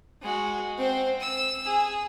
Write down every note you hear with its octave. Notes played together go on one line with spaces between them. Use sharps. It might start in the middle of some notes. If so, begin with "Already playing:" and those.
G#3 F#4
C4 C5
E6
G#4